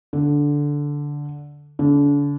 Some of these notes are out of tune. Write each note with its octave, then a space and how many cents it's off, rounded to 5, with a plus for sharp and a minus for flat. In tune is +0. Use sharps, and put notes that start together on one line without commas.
D3 -10
D3 -40